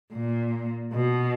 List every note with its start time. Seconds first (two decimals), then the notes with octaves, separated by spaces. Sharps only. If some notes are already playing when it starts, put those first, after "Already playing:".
0.13 A#2
0.93 B2